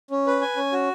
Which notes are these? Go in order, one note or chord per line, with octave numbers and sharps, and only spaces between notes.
C#4
B4
G#5
C#4
F#4